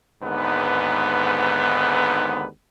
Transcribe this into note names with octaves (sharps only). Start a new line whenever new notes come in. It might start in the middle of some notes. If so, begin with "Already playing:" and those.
G#1 D#2 G#2 D3 B3 B4